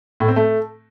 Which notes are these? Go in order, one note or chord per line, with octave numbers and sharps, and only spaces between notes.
A2
C4
A3